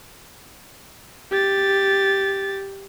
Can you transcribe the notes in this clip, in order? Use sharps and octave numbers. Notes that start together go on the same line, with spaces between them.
G4 A6